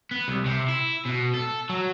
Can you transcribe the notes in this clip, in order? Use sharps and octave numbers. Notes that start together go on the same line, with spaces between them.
B3
C2
C3
E4
B2
A4
F#3